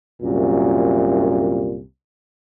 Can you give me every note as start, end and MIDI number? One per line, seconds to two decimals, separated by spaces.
0.22 1.83 36
0.22 1.83 42
0.22 1.83 46